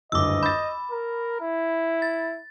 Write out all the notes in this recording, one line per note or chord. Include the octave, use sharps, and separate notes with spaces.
F#1 D2 G2 D#5 D6 E6
B5 G6 A6
A#4
E4
A6